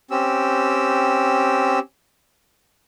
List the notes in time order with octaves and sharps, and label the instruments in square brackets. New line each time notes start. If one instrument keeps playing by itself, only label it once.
[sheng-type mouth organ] C4 C#4 G4 E6